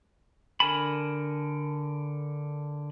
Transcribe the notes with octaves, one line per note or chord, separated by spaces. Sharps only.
D3 A#4 G#5 A5 B5